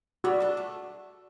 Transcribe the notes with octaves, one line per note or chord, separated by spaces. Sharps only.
G3 F#4
D4 A4
A3